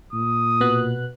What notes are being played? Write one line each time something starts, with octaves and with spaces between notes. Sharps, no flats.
A#2 D#6
B2 B3 F#6